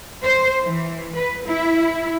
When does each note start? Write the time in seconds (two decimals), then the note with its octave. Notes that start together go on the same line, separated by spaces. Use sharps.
0.24 C5
0.63 E3
1.16 B4
1.47 E4